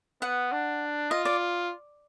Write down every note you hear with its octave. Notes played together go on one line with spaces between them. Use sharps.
B3 F#5
D4
F4 D#5
D5